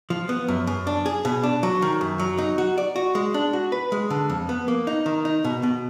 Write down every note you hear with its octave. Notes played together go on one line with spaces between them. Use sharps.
F3
B3
F#2
F#2
D4
G#4
B2
D4
F#3
D#3
F#2
F#3
D#4
F#4
D5
F#4
G#3
D4
F#4
B4
G#3
D3
F2
B3
A#3
D#4
D#3
D#4
B2
B2